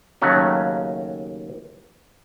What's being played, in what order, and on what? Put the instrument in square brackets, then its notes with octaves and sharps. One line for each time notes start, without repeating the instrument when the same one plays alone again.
[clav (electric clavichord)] D#2 C#3 F#3 A3 C#4